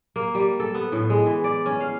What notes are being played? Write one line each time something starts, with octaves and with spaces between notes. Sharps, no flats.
A#3
G3
A4
B3
A2
G#3
E3
D5
C#4
F5